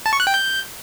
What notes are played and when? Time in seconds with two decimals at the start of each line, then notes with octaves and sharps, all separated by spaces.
0.06 A5
0.13 C#6
0.20 F#6
0.27 G5
0.34 G6